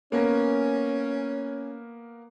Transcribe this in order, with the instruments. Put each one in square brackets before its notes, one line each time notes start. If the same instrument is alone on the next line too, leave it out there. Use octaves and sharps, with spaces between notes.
[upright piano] A#3 B3 A#4 [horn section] C#4